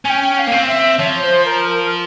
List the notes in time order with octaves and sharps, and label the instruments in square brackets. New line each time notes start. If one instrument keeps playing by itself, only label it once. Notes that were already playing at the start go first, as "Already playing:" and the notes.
[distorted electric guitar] C#4 [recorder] G5 G#5
[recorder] G5
F5
[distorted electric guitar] A#3
C4
[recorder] E5
[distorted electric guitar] F3 [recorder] C#5
[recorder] C5
A#4
A#4